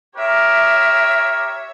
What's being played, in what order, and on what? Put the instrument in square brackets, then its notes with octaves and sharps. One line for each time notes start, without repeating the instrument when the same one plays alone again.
[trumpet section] G4 A#4 [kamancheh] C#5 E5